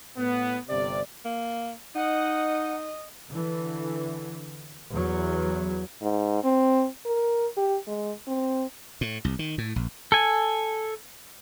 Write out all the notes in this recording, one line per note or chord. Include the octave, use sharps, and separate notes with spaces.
A2 B3
G1 C3 D5
A#3
D#4 D#5 F#5
D3 E3
E2 F#3
G#2
C4
A#4
G4
G#3
C4
A2
C2
D#3
A2
A#1
A4 G#5